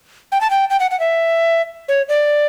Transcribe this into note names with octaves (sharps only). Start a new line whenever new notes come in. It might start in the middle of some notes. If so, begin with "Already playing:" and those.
G5
A5
G5
G5
F#5
F#5
E5
C#5
D5